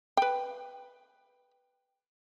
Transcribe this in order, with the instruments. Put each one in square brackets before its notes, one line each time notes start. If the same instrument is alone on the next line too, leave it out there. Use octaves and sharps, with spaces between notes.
[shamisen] B4 G5